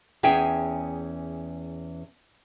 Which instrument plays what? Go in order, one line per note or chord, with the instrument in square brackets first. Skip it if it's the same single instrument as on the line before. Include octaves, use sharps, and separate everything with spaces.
[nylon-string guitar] E2 C#4 G#4 E5 G5 G#5